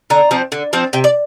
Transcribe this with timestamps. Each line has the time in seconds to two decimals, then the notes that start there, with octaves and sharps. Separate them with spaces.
0.10 D3 A#5
0.31 F3 C4
0.52 D3
0.73 F3 C4
0.93 C3 G5
1.04 D5